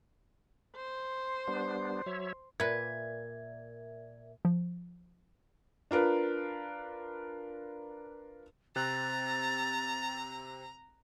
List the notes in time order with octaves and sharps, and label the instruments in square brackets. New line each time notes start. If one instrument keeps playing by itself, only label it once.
[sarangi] C5
[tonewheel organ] G3 B3 D4
F#3 C#5 E5
[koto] A#2 B4 [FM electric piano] A#4 D5 E5 [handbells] G#6
[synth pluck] F3
[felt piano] D4 F4 A#4 B4
[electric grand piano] C3 C4 F#6 [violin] A#5 [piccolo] A6